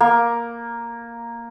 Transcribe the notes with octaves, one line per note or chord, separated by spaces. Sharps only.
A#3